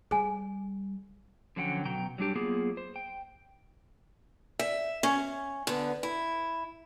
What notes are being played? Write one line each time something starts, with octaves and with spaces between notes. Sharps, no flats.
G3 G#4 G#5
D3 F3 F#3 C#4 F#5 G5
B2 F#3 G5 A#5
F#3 G3 D4 G4
F#3 A#3 B3 F4 G#4
C5
G5
E5
C#4
D3 B3
E4